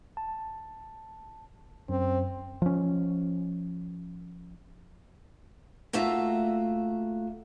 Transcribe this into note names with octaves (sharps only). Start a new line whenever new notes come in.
A5
F#2 C4
F3 C#4
A3 A#3 F4 F#4 E5